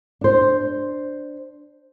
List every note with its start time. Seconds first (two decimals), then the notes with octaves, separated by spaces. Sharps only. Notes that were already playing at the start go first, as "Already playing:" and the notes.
0.21 D4 C5